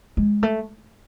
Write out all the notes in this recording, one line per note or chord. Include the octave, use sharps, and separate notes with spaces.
G#3
A3